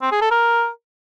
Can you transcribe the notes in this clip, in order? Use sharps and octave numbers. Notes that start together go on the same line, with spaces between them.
C4
G#4
A4
A#4